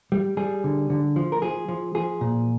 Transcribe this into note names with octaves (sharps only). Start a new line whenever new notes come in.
G3
G3 G#4
D3
D3
F3
A#4
F3 G#4
F3
F3 G#4
A#2